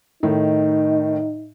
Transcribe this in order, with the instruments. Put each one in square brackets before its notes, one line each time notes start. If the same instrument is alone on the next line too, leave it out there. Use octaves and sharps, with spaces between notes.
[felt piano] A2 D#3 [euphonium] D#4